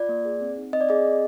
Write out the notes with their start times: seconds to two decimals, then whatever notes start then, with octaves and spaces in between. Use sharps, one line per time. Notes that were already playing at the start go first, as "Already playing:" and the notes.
Already playing: F4 D5
0.09 A#3
0.25 G#4
0.41 C4
0.58 D#4
0.73 C4 D#5
0.81 D5
0.89 G#4 D#5
1.05 C4